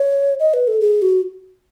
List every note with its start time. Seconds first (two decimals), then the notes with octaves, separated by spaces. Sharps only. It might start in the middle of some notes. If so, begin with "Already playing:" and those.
Already playing: C#5
0.40 D#5
0.54 B4
0.68 A4
0.81 G#4
1.02 F#4